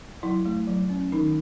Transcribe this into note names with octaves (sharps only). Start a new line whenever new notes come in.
F#3 E4
A3
F#3
C#4
D#3 D#4